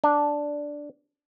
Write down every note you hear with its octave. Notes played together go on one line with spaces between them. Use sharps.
D4